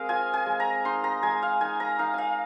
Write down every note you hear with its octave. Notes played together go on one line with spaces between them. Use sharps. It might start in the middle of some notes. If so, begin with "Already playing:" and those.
Already playing: G#3 C4 G#4 A#4 F5
F4 G#5
G#5
G#3
A#5
D#4 C6
A#5
G#3 G#5
F5
D#4 G#5
A#5
D#4 F5
F5 G#5